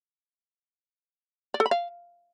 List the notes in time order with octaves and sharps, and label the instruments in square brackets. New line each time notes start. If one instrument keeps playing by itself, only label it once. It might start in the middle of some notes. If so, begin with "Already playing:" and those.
[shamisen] D5
A4
B5
F5